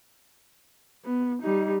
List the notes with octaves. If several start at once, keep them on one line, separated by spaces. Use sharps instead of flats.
B3
G3 D#4